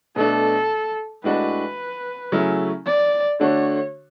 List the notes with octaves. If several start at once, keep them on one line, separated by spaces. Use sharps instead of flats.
B2 A3 D4 A4
A2 G#3 D4 F#4 B4
C#3 F#3 A3 C#4 E4
D5
D3 A3 D4 F#4 C#5